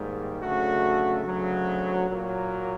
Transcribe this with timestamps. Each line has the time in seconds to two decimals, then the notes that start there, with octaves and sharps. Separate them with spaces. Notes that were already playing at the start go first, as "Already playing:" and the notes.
Already playing: G#2 D#3 G3 A#3
0.42 D2 C#3 F#3 A3 F#4
1.25 D2 C#3 F#3
2.07 A#2 F#3 A#3